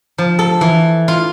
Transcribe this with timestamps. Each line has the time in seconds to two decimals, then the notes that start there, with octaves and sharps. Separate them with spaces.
0.18 F3
0.39 A4
0.61 E3
1.08 F4